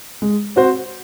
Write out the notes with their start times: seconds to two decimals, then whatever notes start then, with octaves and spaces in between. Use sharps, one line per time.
0.22 G#3
0.56 C4 F#4 C5